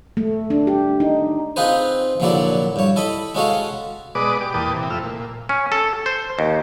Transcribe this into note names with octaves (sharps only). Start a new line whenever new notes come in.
A3
D4
G4
D#4
C4 D#4 F4 G#4 B4 C5
A#1 A#2 D3 F#3 E4 D5
G2 C#5
E4 A4 D#5 B5
G#3 C#4 F#4 A4 C#5 F5
B2 G#3 B4 D5 D6 D#6
G4 D6
E2 A#2 B4 G5 A5 D#6
C3 E3
F2 A3 E6 F6
A#2
C#4
A4
C5
D#2